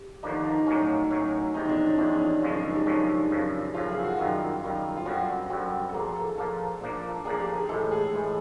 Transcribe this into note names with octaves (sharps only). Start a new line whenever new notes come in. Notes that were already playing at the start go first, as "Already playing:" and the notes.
Already playing: G4
D#2 D3 F3 A#3 D4 D#4
D#4
A2 F#3 A#3 C#4
A2 F#3 A#3 C#4
E2 C3 F3 D#4
D4
C#4
E2 C3 F3 D4
C#4
C#4
F#2 C#3 F3 G#3 C#4 D#4
D4
D#4
G4
F#2 C#3 F3 G#3 C#4
F#2 C#3 F3
F#2 C#3 F3 F4
G#4
F#4
F#2 D#3 G3 F4
F#2 D#3 G3
F4
F#2 D3 G3 C4 F#4
F#2 D3 G3 C4 F#4
A4
A#2 F3 A#3 G#4
A4
A#2 F3 A#3 A4
A#2 F3 A#3 D4
A#2 F3 A#3 D4 G#4
G4
G#4
A2 E3 G#3 A4
G#4
A2 E3 G#3